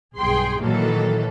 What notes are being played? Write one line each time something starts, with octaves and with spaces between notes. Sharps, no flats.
B1 G2 G#4 G5 C6
A#2 D#3 E3 F#3 A#3 A4